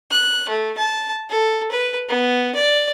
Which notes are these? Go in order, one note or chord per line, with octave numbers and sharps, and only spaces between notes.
F#6
A3
A5
A4
B4
B3
D5